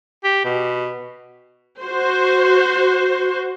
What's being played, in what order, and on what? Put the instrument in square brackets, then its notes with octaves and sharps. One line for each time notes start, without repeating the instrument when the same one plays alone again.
[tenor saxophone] G4
B2
[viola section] F#4 C5